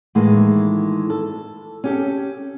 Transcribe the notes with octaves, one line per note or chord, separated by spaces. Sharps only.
A2 D#3 E3 G#3 A#3
A4
C#4 G4 A4